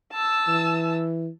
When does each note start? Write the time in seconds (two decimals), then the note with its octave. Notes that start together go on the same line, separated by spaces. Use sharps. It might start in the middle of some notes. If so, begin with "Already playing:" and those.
0.13 A5 E6
0.48 E3